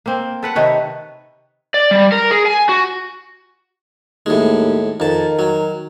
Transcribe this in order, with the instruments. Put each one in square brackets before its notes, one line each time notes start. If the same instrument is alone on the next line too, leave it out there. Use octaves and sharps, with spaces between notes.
[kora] A#3 C4
A4 B4 F#5
C3 D#3 B4 C#5
[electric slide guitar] D5
G3
A#4
G#4
G#5
F#4
[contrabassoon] D#2 [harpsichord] A2 G#3
[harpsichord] F2 A5 [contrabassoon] D#3
[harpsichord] F#3